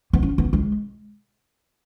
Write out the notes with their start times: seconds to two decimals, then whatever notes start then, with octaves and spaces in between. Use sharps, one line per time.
0.13 B3
0.23 C#4
0.38 B3
0.53 G#3